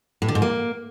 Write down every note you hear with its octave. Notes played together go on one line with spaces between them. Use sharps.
A2
D3
G#2
A#3